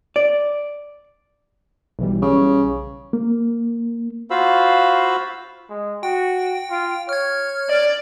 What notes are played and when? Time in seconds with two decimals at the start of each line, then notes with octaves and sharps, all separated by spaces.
0.16 D5
1.99 B1 E3 G3
2.22 C#3
3.13 A#3
4.30 F4 F#4 C5 F5 B5 E6
5.70 G#3
6.03 F#4 G5
6.70 F4
7.09 C#5 F6 G#6
7.70 D5